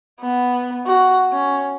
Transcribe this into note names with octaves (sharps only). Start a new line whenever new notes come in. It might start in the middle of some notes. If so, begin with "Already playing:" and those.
B3
F#4
C#4